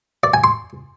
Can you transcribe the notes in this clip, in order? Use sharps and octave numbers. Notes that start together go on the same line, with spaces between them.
D5
G#5
C6